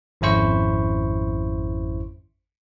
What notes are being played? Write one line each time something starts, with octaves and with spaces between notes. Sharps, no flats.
G#1 F2 C#4 E4 C5 C#6